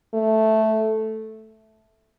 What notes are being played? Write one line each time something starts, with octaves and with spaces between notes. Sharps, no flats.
A3